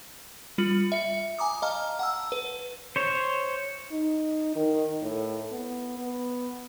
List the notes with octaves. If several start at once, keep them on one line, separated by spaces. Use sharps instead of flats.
G3 F4 C#7 F#7
E5 C#7
G#5 A#5 D6 D#6
D#5 F5 A5 A#5 F6
F#5 A5 E6
B4
C5 C#5
D#4
D#3
A2
B3
B3